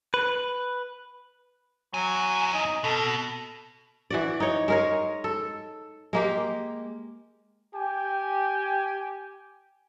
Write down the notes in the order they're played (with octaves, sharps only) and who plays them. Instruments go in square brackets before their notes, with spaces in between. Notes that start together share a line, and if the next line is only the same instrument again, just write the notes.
[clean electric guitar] B4
[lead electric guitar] E2 G#5 [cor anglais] F#3
[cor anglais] D#4
[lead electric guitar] B2 [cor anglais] A4
[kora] E3 F#4 D5
D#4 C#5
G#3 A#4 C#5
A4
G#3 A#3 G4
[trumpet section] G4 G5 G#5